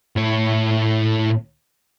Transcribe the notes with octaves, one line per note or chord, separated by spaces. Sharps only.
A2 C#5